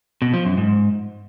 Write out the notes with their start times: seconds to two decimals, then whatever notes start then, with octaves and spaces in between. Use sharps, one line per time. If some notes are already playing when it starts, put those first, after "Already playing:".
0.22 B2
0.34 F3
0.45 F#2
0.57 G#2